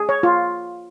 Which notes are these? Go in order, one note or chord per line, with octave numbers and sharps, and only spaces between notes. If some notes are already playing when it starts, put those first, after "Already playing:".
Already playing: G#4
C#5
F4